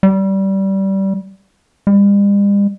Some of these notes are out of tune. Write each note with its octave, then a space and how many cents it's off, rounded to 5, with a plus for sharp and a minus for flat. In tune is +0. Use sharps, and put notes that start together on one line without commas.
G3 -20
G3 +45